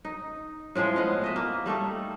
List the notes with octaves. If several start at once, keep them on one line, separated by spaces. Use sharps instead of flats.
D#4
A2 F3 G#3 G#4
B3 D#5 F5
A3 D#5 E5
A#3
G3 A3 D#4 A4